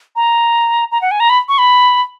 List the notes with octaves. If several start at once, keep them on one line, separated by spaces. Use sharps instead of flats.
A#5
A#5
F#5
G#5
A#5
B5
C#6
B5